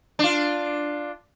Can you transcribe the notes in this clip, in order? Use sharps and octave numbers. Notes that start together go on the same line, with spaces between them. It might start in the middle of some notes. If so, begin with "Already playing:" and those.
D4 F4